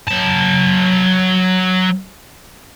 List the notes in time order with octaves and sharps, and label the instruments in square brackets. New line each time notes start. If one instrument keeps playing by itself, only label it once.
[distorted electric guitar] F#3 A5